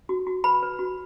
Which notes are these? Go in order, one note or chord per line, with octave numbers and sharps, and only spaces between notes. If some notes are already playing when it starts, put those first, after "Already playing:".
F#4
F#4
B4 B5
B4
F#4